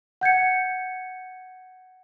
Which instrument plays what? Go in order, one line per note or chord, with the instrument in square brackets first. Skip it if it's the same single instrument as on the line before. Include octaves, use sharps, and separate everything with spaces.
[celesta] F#5 G6 G#6 C#7